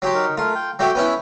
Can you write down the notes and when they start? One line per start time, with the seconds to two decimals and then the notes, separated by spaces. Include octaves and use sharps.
0.02 F#3 G4 C6
0.15 D#4 A#4
0.37 A3 F4 A#4
0.55 G5
0.79 F#3 A3 G4 G5
0.95 B3 C#4 E4